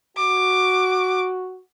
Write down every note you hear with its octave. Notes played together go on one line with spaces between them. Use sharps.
F#4 D6